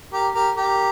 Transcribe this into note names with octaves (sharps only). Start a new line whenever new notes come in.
G4 A#4
G4 A#4
G4 A#4